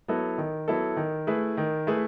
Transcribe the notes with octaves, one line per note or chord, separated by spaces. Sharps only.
F#3 B3 E4 A4
D#3
F#3 B3 E4 A4
D#3
A3 E4 G#4 B4
D#3
A3 E4 G#4 B4